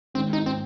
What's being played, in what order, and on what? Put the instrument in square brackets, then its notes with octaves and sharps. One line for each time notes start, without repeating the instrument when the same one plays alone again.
[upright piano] G#1 G#2 D#3 [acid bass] C4
[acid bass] D#4
C4